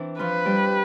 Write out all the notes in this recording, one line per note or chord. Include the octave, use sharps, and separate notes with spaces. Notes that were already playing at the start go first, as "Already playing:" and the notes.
Already playing: E3 C4 D4 E4
F3 F4 B4
G3 G4